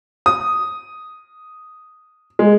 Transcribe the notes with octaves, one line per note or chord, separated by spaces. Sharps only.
D#6
G#3